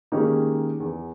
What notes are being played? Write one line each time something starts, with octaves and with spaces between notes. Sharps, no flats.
D#3 G#3 A#3 C#4 D#4 G4
E2